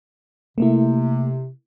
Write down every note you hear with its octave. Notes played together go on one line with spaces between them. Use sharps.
C3 A3 A#3 E4